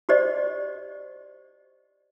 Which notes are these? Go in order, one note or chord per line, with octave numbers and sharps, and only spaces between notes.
F#4 G4 C5 D5 D#5